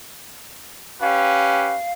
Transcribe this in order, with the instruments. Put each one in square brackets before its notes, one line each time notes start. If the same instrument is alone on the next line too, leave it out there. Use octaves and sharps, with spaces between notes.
[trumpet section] C#4 G4 B4 [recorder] F5